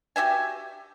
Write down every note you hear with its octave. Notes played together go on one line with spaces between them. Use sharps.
F#4 G4 E5 G#5